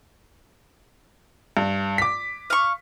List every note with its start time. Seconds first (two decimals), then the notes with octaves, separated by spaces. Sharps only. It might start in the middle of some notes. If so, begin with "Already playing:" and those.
1.57 G2
1.98 D6 B6
2.50 F5 C#6